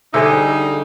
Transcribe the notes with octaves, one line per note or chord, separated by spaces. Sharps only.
D3 G3 D#4 G#4 C5 D#5 E5